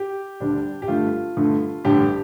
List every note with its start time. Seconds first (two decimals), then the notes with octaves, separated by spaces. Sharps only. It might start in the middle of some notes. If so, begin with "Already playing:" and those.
Already playing: G4
0.40 D2 D3 G3 D4
0.82 G4
0.88 G2 D3 A3 F4
1.37 G2 D3 A3
1.85 A1 G2 D3 G4